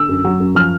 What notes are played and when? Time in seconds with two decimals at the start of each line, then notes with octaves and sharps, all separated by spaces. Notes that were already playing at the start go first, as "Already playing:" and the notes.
Already playing: D3 E6
0.09 F#2
0.24 F#3
0.40 F#2
0.55 F3 F6